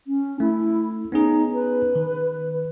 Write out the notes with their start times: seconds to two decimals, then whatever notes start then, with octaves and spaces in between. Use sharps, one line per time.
0.07 C#4
0.40 A3 E4
1.12 B3 C#4 D#4 G#4
1.54 B4
1.96 D#3